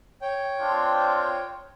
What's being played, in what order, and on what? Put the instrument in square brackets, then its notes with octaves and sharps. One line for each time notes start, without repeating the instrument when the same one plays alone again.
[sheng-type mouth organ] C#5 G5
[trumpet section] C4 D4 F4